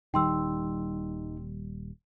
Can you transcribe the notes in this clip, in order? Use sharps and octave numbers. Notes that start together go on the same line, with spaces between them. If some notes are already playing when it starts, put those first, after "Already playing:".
D#1 D#3 G3 D#4 G5 C6 E6